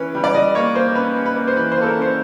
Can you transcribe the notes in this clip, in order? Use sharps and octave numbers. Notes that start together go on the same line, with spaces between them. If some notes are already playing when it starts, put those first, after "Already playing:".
Already playing: E3 C#4 B4
G3
D5
G3 D#5
A#3 C#5
A#3 C5
C#4 B4
C#4
B4
A#3
C5
E3 B4
C5
A#3 A4
A#4
C#4 C5